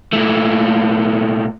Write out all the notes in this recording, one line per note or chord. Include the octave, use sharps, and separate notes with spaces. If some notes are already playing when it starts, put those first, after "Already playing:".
A#2 A3